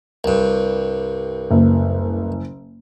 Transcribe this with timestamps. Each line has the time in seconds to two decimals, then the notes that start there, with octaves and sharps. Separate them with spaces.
0.24 C2 G2
1.51 F#1